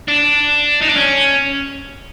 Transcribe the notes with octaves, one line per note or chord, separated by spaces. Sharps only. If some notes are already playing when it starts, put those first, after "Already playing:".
D4
D#4
D4
C#4